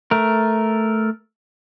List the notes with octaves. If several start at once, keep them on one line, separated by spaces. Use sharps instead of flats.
A3 A#4